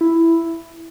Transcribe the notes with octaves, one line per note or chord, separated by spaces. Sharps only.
E4